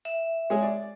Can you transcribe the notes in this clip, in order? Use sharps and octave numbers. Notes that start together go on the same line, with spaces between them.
E5
G#3 G#4 C#5
D5